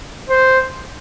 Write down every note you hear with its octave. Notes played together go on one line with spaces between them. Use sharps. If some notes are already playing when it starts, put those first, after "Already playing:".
C5